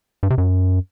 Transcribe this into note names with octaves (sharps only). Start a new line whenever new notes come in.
G2
C3
F#2